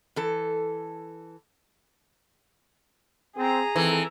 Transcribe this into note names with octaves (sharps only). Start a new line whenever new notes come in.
E3 A4
C4 G#4 A#5
D#3 E3 C4 A4